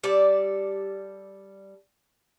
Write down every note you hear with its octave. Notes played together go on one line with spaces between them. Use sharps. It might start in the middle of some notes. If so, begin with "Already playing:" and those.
G3 A4 D5